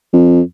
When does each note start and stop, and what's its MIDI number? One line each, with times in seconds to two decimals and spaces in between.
0.13 0.41 41